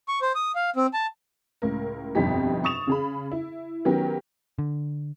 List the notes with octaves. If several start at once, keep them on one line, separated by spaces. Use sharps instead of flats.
C#6
C5
D#6
F5
C4
A5
C#2 A2 A#4
G1 F2 B2 D#4 G4 B6
C#6 D#6 A6 E7 F7
C#3 G#4 B5
E4
D#3 F#3 B3 C#4 G4 A#4
D3